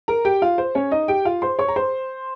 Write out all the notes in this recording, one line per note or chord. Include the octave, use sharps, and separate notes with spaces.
A#4 A#5
G4 G5
F4 F5
C5
C#4 C#5
D#4 D#5
G4 G5
F4 F5
C5 C6
C#5 C#6
A#5
C5 C6